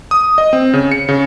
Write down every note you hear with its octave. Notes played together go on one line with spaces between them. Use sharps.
D#6
D#5
C4
C#3
C#7
C#3